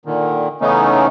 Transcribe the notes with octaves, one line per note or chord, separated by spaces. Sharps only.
A#2 D3 D#3
C#3 E3 A3 B3 C#4 D#4